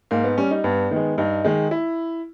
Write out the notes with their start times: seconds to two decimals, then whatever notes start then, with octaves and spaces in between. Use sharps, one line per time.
0.11 G#2 A#3
0.24 B3
0.37 G3 C#4
0.51 D#4
0.64 G2 B3
0.91 D#3 G#3
1.18 G2 D#4
1.44 D#3 G#3
1.71 E4